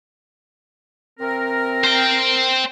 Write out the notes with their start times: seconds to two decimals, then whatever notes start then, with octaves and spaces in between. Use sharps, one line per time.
1.20 C3 C4 A#4
1.84 C5 G5